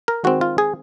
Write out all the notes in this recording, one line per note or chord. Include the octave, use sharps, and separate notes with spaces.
A#4
D#3 G#3 C4 F#4
F4
G#4